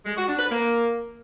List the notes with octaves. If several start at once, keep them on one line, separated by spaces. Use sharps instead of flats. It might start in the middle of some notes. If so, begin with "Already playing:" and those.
G#3
F#4
D4
B4
A#3